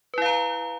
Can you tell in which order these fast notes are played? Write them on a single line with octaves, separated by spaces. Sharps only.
B4 E4 F5 A#5